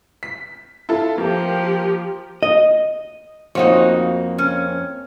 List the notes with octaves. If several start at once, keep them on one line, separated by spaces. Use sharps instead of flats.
B6
E4 F4 A4
F3 A#3 G4
D#5
F2 A#3 D#4 F#4 C#5
C#4